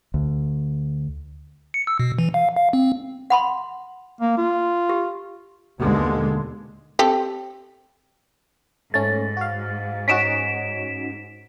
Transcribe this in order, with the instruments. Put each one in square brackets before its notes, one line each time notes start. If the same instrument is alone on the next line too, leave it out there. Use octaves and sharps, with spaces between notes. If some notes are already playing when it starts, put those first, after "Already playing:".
[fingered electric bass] D2
[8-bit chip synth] C#7
E6
B2
E3
F5
F5
C4
[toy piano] F#5 B5 C6
[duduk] A#3
F4
[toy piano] G4
[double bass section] D#2 B2 D3 G#3
[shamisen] C4 G4 A4
[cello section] G#2 [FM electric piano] A3 C#4 [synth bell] A6
[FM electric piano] F#4 F5
[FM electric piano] C#4 D#4 F#4 [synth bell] B6 D7 E7